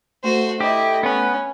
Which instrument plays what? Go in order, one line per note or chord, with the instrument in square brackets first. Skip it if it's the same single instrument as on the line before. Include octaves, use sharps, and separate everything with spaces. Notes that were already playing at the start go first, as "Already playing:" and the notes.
[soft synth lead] A3 [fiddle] F#4 C5
[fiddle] E4 D#5 [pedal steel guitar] G4
[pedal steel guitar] B3 B4 [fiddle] C#4